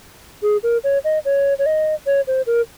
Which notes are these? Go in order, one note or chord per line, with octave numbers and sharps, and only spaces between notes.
G#4
A#4
C#5
D#5
C#5
C#5
D#5
C#5
C5
A#4